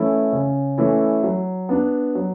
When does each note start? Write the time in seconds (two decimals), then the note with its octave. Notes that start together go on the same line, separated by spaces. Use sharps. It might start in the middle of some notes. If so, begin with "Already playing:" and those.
Already playing: E3 A3 C#4 E4
0.33 C#3
0.78 E3 A3 C#4 E4
1.23 F#3
1.69 B3 D4
2.15 F#3